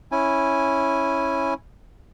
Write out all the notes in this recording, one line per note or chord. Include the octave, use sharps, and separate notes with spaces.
C#4 E4 G#5